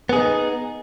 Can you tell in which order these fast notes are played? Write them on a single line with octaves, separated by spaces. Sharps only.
B3 G#4 D#4